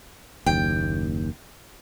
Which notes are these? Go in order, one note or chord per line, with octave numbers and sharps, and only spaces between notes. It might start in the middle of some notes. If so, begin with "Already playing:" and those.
F#1 D#2 G5